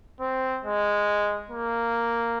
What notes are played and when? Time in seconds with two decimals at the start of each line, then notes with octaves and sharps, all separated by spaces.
0.21 C4
0.65 G#3
1.50 A#3